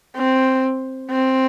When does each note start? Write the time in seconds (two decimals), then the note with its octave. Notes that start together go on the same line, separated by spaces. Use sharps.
0.16 C4
1.12 C4